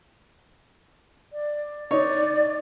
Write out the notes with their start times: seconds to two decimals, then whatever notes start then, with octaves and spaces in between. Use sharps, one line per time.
1.33 D5
1.91 D#4 C#5 D5